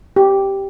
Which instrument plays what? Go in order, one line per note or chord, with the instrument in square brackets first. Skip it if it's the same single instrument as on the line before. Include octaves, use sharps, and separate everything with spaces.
[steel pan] G4